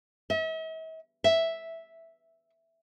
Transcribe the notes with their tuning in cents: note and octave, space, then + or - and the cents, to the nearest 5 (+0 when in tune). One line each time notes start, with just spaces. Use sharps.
E5 -45
E5 -5